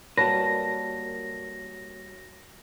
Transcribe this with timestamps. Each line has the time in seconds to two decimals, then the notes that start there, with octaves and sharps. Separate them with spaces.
0.17 G3 A#3 F#4 B4 C#5 A5 A#6